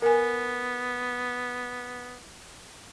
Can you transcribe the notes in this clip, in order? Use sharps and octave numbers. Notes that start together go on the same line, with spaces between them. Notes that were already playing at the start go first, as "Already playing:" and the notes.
B3 A#4 G#5